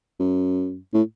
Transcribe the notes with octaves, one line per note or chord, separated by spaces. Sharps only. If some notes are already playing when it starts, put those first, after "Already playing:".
F#2
A2